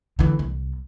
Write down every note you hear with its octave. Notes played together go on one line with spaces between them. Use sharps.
D3 E3
C2